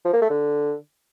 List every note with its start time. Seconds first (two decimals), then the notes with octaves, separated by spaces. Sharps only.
0.05 F3
0.13 A#3
0.22 A3
0.30 D3